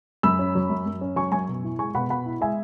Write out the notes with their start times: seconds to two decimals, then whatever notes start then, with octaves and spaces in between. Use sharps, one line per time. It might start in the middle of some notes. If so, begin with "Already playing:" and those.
0.23 F#2 B5 E6
0.39 C#4
0.55 F#3
0.70 F#2
0.86 F#2
1.01 C#4
1.16 F#3 G#5 C#6
1.32 F#2 G#5 C#6
1.48 B2
1.64 E4
1.79 G#3 G#5 C#6
1.95 B2 F#5 B5
2.10 B2 F#5 B5
2.26 E4
2.41 G#3 E5 G#5